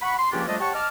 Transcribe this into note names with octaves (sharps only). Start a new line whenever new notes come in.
F#5 B5 C#6
C6
C#2 F3 A#3 C#4 D4 G4
F3 G3 A3 D4 A4 D#5
G4 C#5 F#5 A5 C#6
D#5 A5 D6 F6